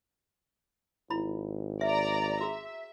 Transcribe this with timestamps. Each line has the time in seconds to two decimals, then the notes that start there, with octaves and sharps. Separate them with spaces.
1.10 G#1 E4 B5
1.81 D5 E5 A#5
2.41 F#4 G#4 E5